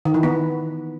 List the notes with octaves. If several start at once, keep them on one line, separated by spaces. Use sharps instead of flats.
D#3
E3
B3